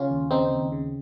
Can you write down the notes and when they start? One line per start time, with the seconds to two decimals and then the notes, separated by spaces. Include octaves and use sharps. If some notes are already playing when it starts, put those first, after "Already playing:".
Already playing: C#3 C#4 F4
0.10 D#2
0.31 C#3 C4 D#4
0.51 D#2
0.72 C#3